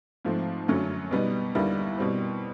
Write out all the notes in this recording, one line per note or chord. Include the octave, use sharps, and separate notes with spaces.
G#2 F3 A3 C4
F#2 D3 F#3 A3 C#4
B2 G3 B3 D#4
D#2 D3 G3 B3 E4
B2 G3 C4